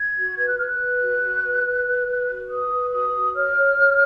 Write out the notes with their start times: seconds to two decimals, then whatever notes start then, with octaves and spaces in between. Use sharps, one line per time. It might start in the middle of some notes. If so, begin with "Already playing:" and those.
Already playing: G#6
0.16 F#4
0.36 B4 G#6
0.47 F#6
0.57 B4 F6
0.67 F#6
0.78 B4
0.99 F#4
1.22 F#4
1.43 B4
1.64 B4
1.85 B4
2.06 B4
2.27 F#4
2.48 B4 D#6
2.70 B4
2.91 F#4 D#6
3.12 F#4
3.34 C#5 F6
3.55 C#5
3.76 C#5